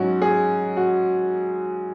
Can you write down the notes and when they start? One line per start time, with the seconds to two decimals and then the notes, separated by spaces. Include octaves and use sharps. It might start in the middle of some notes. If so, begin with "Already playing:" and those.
Already playing: G#2 F#3 C#4 F#4
0.22 G#4
0.77 F#4